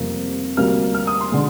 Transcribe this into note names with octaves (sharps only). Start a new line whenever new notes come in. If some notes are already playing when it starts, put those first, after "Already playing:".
Already playing: F1 F2 C3 G3 A#3
D2 C3 G3 A#3 F6
F6
D#6
C6
D3 G#3